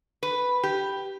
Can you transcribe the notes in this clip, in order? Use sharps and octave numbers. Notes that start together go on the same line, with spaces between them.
B4
G4